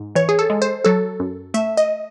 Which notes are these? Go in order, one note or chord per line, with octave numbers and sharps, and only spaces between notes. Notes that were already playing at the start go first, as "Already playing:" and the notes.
Already playing: G#2
E3 C#5
G#4
A4
G#3
C5
F#3 A4
F#2
A3 E5
D#5